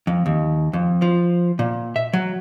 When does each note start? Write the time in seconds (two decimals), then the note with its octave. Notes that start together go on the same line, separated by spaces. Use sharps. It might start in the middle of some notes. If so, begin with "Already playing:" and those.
0.07 F2
0.26 D#2
0.73 F2
1.02 F3
1.59 A#2
1.96 E5
2.13 F#3